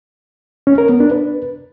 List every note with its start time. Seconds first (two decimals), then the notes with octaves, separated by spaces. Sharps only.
0.67 C#4
0.78 A#4
0.89 B3
1.00 D4
1.11 B4